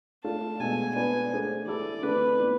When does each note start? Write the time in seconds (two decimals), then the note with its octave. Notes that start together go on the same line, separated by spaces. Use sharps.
0.24 A3 D4 F4 A5
0.60 B2 G#3 D4 A4 G#5
0.95 B3 D4 F4 B4 D5 G#5
1.32 A3 D4 G#4 C5
1.66 E3 A3 E4 A4 D5
2.03 D3 A3 C4 B4
2.39 E3 B3 D4